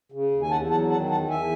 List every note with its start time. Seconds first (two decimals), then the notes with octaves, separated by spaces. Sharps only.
0.12 C#3
0.31 D#2
0.42 G#5
0.51 E2 F#5 A5
0.70 F#3 F#5 A5
0.90 D#3 F#5 A5
1.10 E2 F#5 A5
1.29 E2 E5 G#5